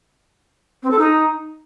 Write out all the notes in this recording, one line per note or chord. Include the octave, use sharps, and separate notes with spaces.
C4
A4
D#4